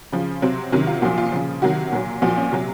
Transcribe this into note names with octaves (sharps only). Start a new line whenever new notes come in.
C#3 F3
C3 F#3 C4
C3 D#3 F#3 C#4
F4
A#2 F3 F#4
F4
C#3 F3
C3 D#3 F#3 F#4
A#2 F#3
A#2 F3 F#4
C#4
C3 F#3